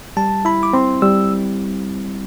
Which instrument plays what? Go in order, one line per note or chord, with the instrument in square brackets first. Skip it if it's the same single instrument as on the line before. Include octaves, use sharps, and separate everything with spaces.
[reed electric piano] G3 [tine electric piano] A5
[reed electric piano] E4 [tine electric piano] B5
[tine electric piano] D6
[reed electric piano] C4 [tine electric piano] C6
[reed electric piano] G3 [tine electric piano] E6